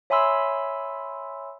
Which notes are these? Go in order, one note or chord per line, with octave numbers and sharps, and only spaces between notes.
C#5 E5 G#5 B5 C6 E6